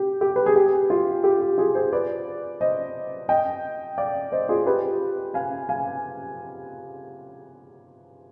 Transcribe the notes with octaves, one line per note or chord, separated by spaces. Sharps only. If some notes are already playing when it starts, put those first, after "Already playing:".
Already playing: G4
G4
B4
G#4
G4
F4
G4
G4
F4 G#4
G#4 C5
B4 D5
C5 D#5
D#5 G5
D5 F5
C5 D#5
F4 G#4
G4 B4
F5 G#5
F5 G#5